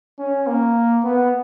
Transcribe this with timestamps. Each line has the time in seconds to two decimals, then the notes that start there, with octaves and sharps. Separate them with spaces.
0.19 C#4
0.47 A#3
1.04 B3